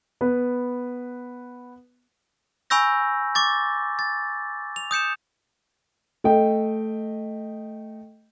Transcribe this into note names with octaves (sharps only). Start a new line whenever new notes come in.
B3 B4
G#5 B5 C#6 E6 G6 A#6
C#6 D6 A6
A6
F7
D#6 G6 C#7 E7
A3 D#5 G5